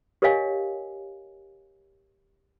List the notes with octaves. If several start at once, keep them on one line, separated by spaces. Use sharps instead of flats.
G4 A#4 C#5 D#5 F5 G#5